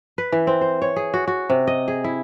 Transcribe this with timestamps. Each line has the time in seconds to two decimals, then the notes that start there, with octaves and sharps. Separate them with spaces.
0.18 B4
0.32 E3
0.47 C4
0.61 C5
0.82 C#5
0.96 G#4
1.14 F#4
1.28 F#4
1.50 C3
1.67 D#5
1.88 G#4
2.04 E4